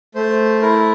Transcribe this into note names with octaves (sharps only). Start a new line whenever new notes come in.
A3 C5
E4 A#4